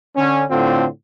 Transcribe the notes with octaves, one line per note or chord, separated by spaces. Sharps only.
D3 C#4
A2 D3 C4 F4